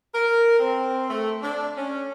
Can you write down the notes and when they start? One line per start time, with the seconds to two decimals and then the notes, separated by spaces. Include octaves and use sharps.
0.14 A#4
0.59 C4
1.10 A3
1.42 D4
1.77 C#4